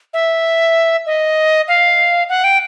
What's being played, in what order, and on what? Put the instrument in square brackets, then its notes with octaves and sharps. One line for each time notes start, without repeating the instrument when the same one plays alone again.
[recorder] E5
D#5
F5
F#5
G5